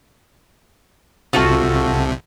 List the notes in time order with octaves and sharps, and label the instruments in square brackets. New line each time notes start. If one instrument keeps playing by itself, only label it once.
[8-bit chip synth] C2 C3 [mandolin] F4 F#4 A4